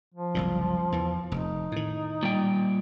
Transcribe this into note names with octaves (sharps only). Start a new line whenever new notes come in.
F3
F#1 C2 A#2
E2 E3
F1 D#4
A2 D#3
A#2 G3 G5